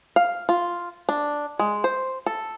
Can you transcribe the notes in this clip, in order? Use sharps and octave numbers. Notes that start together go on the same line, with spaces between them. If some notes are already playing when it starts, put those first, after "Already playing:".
F5
F4
D4
G#3
C5
A4